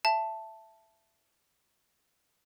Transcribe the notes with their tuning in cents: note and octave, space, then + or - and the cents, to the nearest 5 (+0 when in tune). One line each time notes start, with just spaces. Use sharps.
E5 +15 A5 +0